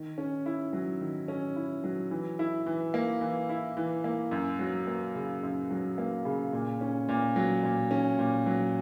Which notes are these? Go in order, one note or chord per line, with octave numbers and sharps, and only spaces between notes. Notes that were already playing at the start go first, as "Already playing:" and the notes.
Already playing: D#3
C#4
E4
F#3
D#3
C#4
E4
F#3
E3
E4
E3
A#3
E3
E4
E3
A#3
F#2
F#3
A#3
C#3
F#2
F#3
A#3
C#3
A#2
C#4
A#2
F#3
A#2
C#4
A#2
F#3